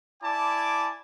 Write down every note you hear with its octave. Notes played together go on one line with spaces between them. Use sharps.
E4 D5 G#5 A5 B5 D6